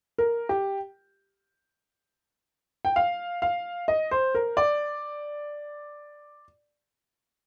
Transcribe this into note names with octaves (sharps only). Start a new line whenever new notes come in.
A#4
G4
G5
F5
F5
D#5
C5
A#4
D5